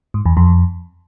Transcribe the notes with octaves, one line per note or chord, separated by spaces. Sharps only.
G#2
E2
F2